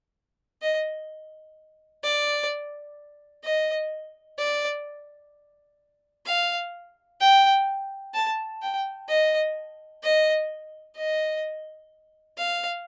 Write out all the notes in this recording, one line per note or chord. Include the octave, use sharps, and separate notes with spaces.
D#5
D5
D#5
D5
F5
G5
A5
G5
D#5
D#5
D#5
F5